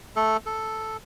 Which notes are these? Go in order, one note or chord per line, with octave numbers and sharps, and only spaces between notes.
A3 A4
A4